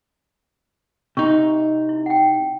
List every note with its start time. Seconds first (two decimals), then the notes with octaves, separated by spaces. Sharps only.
1.17 C3 D#4 C#6
1.89 E4
2.06 F#5 G5